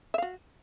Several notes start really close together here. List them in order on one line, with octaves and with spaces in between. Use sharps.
E5 F5 F#4